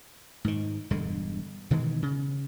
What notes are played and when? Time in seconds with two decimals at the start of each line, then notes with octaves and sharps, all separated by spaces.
0.44 G#2 D#3
0.90 E1 G2 D3 G#3
1.71 B2 D#3 E3 G#3
2.02 C#3